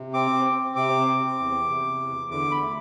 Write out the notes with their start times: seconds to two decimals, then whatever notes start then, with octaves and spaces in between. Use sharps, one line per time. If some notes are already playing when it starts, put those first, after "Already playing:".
Already playing: C3
0.13 C4 D6
0.45 C4
0.76 C3 D6
1.07 C4
1.38 E2
1.69 C3
2.00 E2
2.31 D3 D6
2.51 B5
2.62 A3